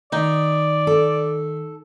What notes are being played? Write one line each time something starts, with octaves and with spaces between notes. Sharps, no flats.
D#3 D#4 D5
A4